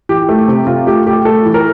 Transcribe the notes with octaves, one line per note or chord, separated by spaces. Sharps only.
E3 G4
A3
C3
C3 F4
A3 G4
A3 G4
A3 A4
E3
A#4